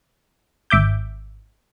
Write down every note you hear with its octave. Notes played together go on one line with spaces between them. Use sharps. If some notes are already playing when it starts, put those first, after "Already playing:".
G#1 E5 D6 G6